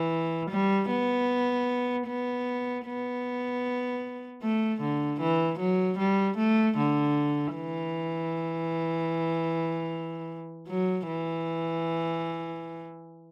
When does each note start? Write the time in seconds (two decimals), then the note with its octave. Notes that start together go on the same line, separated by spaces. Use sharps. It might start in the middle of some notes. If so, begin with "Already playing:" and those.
Already playing: E3
0.50 G3
0.91 B3
2.07 B3
2.86 B3
4.43 A3
4.81 D3
5.21 E3
5.59 F#3
5.98 G3
6.37 A3
6.77 D3
7.55 E3
10.68 F#3
11.07 E3